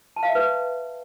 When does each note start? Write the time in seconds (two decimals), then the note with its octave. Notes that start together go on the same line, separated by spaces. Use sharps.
0.16 A5
0.23 F5
0.29 E5
0.35 B4